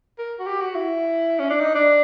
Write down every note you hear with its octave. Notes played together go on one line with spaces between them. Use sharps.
A#4
F#4
G4
F#4
E4
C#4
D4
D#4
D4